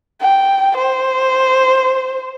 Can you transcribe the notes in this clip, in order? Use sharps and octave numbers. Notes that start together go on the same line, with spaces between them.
G5
C5